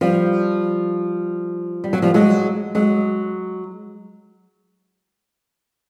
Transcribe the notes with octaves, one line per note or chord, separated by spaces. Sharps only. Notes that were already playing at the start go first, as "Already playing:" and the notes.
F3 G3
G3
F#3
F3 G3
F#3 G#3
F#3 G#3